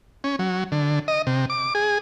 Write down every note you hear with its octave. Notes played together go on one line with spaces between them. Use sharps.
C#4
F#3
D3
D#5
C3
D6
G#4